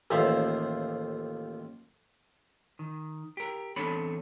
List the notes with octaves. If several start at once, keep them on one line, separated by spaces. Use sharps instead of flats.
A1 D#2 F3 E5 F5
D#3
G4 A#4
E2 C4 D4 A4 C#5 B5